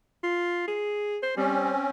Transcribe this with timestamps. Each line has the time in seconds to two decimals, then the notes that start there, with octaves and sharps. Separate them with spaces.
0.23 F4
0.67 G#4
1.23 C5
1.37 G3 C4 C#4